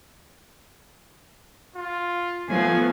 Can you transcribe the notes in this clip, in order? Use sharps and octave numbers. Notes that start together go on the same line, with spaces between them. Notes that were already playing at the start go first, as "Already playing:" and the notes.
F4
F3 A3 B3 G#5